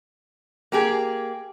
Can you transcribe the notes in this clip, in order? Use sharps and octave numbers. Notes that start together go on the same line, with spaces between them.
A#3 G4 G#4